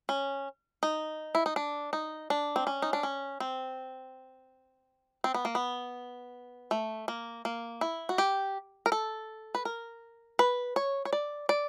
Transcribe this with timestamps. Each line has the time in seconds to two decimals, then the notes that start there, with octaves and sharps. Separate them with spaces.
0.09 C#4
0.83 D#4
1.35 E4
1.46 D#4
1.56 D4
1.93 D#4
2.30 D4
2.56 C4
2.67 C#4
2.82 D#4
2.93 D4
3.03 C#4
3.40 C4
5.24 C4
5.34 B3
5.45 A#3
5.55 B3
6.71 A3
7.08 A#3
7.45 A#3
7.81 E4
8.09 F#4
8.18 G4
8.86 A#4
8.92 A4
9.55 B4
9.65 A#4
10.39 B4
10.76 C#5
11.05 C#5
11.13 D5
11.49 D5